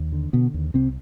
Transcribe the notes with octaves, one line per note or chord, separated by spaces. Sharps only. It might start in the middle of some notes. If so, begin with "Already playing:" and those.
Already playing: D#2
D3
B2 D3 B3
D#2
C2 C3 C4